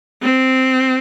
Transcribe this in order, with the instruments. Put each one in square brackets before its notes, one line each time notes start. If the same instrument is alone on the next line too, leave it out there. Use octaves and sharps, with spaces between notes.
[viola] C4